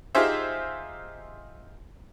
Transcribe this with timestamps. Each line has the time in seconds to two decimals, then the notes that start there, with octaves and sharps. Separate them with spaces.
0.15 D#4 F4 G4 G#4 C5 E5